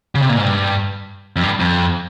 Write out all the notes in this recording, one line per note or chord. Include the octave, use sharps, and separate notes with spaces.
C#3
C3
A#2
G#2
G2
F2
G2
F2